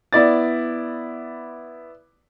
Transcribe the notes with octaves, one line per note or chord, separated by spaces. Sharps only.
B3 E4 D5 A6